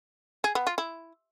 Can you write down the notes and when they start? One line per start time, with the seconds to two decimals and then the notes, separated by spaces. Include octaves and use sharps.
0.44 G#4
0.55 B3
0.67 F4
0.78 E4